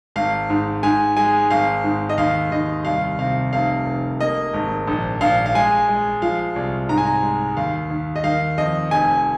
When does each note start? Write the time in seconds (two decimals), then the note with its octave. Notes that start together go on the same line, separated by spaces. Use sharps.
0.16 G#1 F5
0.50 G#2
0.83 G#2 G#5
1.17 G#3 G#5
1.50 G#1 F5
1.84 G#2
2.10 D#5
2.18 D#2 F5
2.51 D#2 D#5
2.85 C2 F5
3.19 C3 F5
3.52 F1 F5
3.86 F1
4.20 A#3 D#5
4.54 G#1
4.87 A#1
5.21 A#1 F5
5.46 F5
5.55 G#3 G#5
5.89 G#3
6.22 F3 F5
6.56 C2
6.89 G#2 A#5
6.98 G#5
7.05 A#5
7.23 G#3
7.57 D#2 F5
7.90 D#2
8.16 D#5
8.24 D#3 F5
8.58 F2 D#5
8.91 F1 G#5